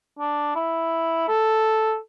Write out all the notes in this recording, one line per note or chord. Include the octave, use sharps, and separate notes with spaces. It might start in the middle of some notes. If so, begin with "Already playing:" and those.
D4
E4
A4